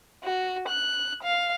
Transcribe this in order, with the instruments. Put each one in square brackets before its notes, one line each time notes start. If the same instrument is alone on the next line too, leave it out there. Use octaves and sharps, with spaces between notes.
[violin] F#4
F#6
F5